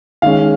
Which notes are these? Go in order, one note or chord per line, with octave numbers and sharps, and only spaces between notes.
D#3 G#3 C#4 F5